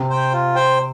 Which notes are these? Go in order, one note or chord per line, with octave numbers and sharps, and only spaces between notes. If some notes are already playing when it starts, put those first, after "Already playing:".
Already playing: C3
C5 G5
F4
C5 G5